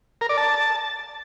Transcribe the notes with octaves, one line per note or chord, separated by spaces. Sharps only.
A#4
D5
A5